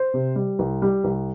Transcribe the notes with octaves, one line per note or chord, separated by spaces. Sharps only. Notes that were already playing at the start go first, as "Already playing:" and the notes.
Already playing: C5
C3
G3
C2
G3
C2